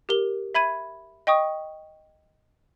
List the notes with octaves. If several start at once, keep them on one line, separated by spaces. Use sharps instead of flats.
G4 A#4 G7
E5 B5 G#6 D#7
D#5 G5 C#6 D#6